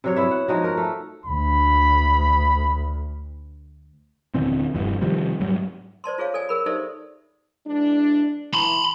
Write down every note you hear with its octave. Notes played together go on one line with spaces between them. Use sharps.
C3 F#3 C#5
B3 E4 E5
F#5
F3 G#3 D#4 F#4
A#4
A3
D2 B5
D#1 D3 E3 C4
F1 G2 E3
C3 D#3 F3 G3
G#2 F#3 G3
C5 D5 A5 C6
F4 G#4 C#5 F5
A4 D5 G#5
G#4 A#4 B5
D#4 G4 A4 C5 D5 E5
E3 G#3 D4
E3 B5 C6